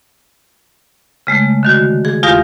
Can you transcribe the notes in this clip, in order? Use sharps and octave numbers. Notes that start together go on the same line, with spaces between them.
C#3 G#3 A3
D3 D#3 F#4
G#4
E2 F4 G4 F5 D#6 A#6